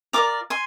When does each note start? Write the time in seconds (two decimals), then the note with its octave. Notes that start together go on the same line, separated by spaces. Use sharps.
0.13 F4 A#4 D5 A#5 D6
0.50 G#5 C6